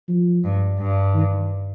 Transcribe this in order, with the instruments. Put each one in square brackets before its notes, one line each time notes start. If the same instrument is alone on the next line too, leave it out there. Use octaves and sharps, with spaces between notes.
[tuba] F3
[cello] G2
G2
[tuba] D#3